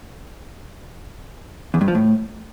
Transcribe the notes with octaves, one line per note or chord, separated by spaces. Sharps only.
E2
G2
F3
A2